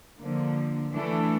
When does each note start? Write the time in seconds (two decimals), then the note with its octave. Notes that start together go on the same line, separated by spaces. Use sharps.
0.21 D3 F3 A#3
0.92 E3 A3 D4 A4